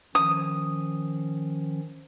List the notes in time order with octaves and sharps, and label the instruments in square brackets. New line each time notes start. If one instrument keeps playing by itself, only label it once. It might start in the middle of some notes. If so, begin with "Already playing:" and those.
[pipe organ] D#3 F3 C#4 [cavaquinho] D#6